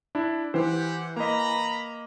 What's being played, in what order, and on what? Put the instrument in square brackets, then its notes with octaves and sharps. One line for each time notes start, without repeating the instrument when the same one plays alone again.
[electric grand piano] D4 E4
[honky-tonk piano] E3 [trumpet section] G4 F#5 [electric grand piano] C5
[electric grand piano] A#3 D#5 [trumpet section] A#5 B5